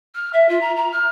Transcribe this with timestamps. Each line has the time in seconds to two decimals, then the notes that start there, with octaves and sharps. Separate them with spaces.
0.15 F6
0.33 E5
0.49 F4
0.61 A#5
0.76 A#5
0.92 F6